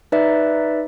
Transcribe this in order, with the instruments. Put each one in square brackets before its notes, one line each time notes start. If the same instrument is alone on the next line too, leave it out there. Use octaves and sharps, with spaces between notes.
[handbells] D#4 B4 D5 E5